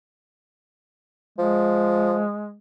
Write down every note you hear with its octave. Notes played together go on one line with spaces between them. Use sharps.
F3 G#3